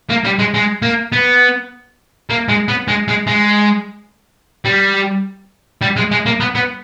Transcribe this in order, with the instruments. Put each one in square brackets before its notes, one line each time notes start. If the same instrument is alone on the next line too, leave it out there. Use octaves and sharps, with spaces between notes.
[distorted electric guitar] A#3
G3
G#3
G#3
A#3
B3
A#3
G#3
B3
G#3
G#3
G#3
G3
G3
G#3
G#3
A#3
B3
B3